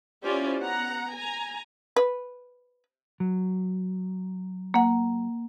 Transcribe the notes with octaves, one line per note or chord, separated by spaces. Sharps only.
C#4 E4 F4 G4 C5 D5
B3 F#5 A#5
G#5 A#5
B4
F#3
A#3 F#5